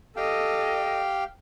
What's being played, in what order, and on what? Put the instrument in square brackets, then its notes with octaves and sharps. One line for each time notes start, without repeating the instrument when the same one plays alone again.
[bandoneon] G4 F5 G5 [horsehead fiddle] A4 D#5